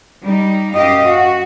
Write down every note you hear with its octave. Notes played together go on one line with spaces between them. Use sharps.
G3 D#4
F#2 G4 D#5 F5
F#4